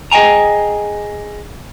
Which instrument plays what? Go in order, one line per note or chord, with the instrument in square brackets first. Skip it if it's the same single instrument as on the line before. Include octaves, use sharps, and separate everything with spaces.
[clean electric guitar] G#4 D#5 G5 G#5 A#5